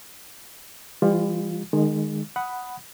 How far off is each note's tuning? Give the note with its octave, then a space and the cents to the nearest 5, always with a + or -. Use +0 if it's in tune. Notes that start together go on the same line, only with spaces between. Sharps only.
E3 +35 G3 +35 F4 +0
D#3 -25 G#3 +0
F#5 +0 B5 +0 D#6 +5